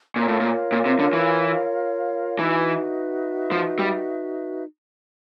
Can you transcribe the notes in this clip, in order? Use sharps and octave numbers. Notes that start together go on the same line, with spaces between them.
A#2 F4 A#4 C#5 F5
A2
A#2
A#2
C3
D3
E3
E3 D#4 F#4 B4 E5
F3
G3